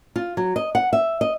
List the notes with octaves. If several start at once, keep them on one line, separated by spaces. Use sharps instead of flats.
F4
F#3
D#5
F#5
E5
D#5